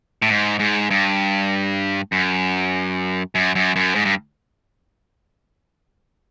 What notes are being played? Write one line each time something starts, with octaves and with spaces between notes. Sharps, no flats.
A2
G#2
G#2
G2
F#2
F#2
F#2
F#2
G#2
G2